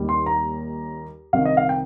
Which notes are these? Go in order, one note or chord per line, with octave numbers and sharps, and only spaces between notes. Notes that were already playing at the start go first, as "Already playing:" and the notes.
Already playing: D#2 D#3 G3
C6
A#5
C2 C3 D#3 F5
D#5
F5
G5